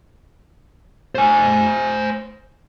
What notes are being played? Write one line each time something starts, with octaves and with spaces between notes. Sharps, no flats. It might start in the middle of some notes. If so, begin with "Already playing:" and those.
C5 G#5